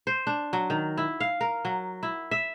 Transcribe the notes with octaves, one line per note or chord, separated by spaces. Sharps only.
C5
D4
F#3
D#3
E4
F5
A#4
F#3
E4
E5